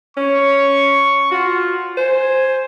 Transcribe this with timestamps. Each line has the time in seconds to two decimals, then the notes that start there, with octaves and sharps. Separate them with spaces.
0.17 C#4 C#6
1.32 F4 F#4
1.97 C5 G#5